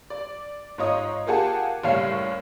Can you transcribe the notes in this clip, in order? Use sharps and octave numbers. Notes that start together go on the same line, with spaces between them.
D5
G#2 F4 C#5 D#5 D#6
A#3 F4 G4 G#4 F#5 A5
F#1 A2 G3 C#5 F5 C7